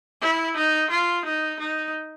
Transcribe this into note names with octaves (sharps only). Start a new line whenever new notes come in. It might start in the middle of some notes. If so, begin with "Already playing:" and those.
E4
D#4
F4
D#4
D#4